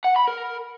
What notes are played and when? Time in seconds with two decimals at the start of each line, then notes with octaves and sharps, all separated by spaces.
0.04 F#5
0.16 B5
0.28 A#4